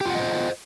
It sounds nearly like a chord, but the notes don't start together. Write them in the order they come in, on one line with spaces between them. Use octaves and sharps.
G4 F4 F#5 D#5 C5